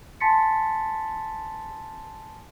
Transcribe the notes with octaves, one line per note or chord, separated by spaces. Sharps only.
G#5 A5 C6 A6 B6 C#7